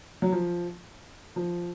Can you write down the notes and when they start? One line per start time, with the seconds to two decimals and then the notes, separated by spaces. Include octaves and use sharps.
0.22 F#3
0.32 F3
1.36 F3